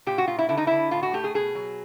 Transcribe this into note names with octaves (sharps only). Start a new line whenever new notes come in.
A#2 G4
F#4
A#2 F4
E4
D3 E4
D#4
D3 E4
A2 F4
F#4
A3 G4
G#4
B2 G#4
F#3